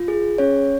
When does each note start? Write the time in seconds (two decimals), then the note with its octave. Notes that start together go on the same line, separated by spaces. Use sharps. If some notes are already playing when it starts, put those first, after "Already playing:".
Already playing: F4
0.08 G#4
0.38 C#4 C#5